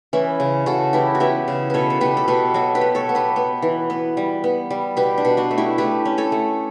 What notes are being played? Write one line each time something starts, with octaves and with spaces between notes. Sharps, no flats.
E3 C#4 E4
C#3
C#3 F#4 A4
E3 E4 G4
F#4
B3 E4 G4
C#3
B2 A4 B4 C#5
A4
B2 G4 B4
A4
B2 G4 B4
F#3 F#4 A4
G4 B4
B3
A4 C#5
B3
G4 B4
B3
E3
B3
G3
B3
G3
B2 G4 B4
D4
B2
D4 F#4
A3
E4 G4
A3 G4 B4
C#4
A4 C#5
A3